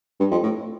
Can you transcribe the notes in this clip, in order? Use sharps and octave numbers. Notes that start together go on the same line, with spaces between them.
G2
F2
A2